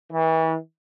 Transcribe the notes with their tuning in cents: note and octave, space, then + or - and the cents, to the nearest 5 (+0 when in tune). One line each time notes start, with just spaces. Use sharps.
E3 -35